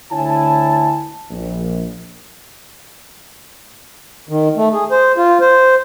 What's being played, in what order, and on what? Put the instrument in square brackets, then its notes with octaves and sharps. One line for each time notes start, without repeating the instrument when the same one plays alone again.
[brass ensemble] D2 D3 E4 C#5 G#5 A5
A#1
[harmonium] D#3
A3
G#4
C5
F4
C5